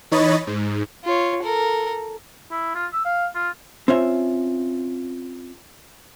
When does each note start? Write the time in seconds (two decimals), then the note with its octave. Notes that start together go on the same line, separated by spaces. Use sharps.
0.11 E3 D#4 C#5 D#5 B5 A6
0.47 G#2
1.04 F4 C#5
1.43 A4 A#4
2.51 E4
2.75 F4
2.93 E6
3.05 F5
3.35 F4
3.88 C4 C#4 F4 E5